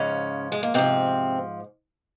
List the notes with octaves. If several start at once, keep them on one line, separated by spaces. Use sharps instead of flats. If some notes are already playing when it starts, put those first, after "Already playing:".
Already playing: G#2 C#3 F3 C#4
G#3
A#3
G#2 C3 F3 C4